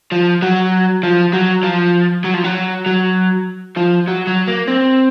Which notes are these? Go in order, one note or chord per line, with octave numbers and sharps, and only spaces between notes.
F3
F#3
F3
F#3
F3
F#3
F3
F#3
F#3
F3
F#3
F#3
A#3
C4